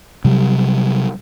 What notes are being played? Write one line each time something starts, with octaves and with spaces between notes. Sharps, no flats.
C3 F#3 G3